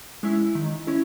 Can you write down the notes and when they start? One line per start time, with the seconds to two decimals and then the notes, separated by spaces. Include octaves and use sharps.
0.23 G#3 C#4 E4
0.55 D#3
0.87 C#4 E4